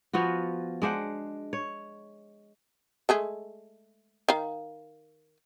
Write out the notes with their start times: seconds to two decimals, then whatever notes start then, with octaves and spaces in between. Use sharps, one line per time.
0.13 F3 B3 F4 F#4
0.82 G#3 D4 C5 F#5
1.53 C#5
3.09 G#3 A3 G#4
4.29 D#3 F5